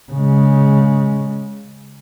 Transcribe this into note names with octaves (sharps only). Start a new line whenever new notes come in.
C#3 G#3